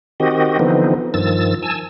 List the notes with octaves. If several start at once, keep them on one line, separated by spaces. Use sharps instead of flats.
D#3 C4 F#4 G4 D#5
D3 E3 F3 B3 C4 D#4
G2 D#3 F3 E6 A6
G#5 A5 E6